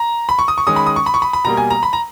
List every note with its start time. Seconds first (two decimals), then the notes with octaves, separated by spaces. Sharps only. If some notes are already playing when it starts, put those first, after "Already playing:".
Already playing: A#5
0.29 B5
0.39 C#6
0.48 D#6
0.58 C#6
0.67 D#3 G#3 C#4 D#6
0.76 B5
0.86 D#6
0.96 C#6
1.06 B5
1.14 C#6
1.22 B5
1.33 B5
1.44 B2 G3 A#3 A#5
1.57 G#5
1.70 A#5
1.83 B5
1.93 A#5